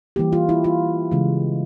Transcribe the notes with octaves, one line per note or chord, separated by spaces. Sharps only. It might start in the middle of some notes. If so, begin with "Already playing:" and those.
E3 G3 A#3 G4
F4
E4
F4
C#3 E3 G#3